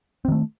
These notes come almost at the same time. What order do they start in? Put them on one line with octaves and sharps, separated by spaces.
C4 D#3 A3